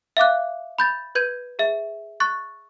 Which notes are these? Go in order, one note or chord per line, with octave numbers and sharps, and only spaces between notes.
E5 F5 D6 F#6
B5 G6 A6
B4 G6 G#6 D#7
G#4 E5
C#6 F#6 A6